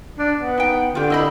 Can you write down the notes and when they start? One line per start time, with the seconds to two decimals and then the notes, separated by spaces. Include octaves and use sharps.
0.19 D4
0.39 B3
0.58 D#4 G5
0.95 D3 F4 G4
1.10 E4 D#5 B5